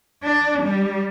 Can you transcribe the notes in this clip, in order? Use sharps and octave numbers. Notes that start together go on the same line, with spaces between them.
D4
G3